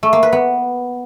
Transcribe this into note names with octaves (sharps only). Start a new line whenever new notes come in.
A3
A#3
B4
B3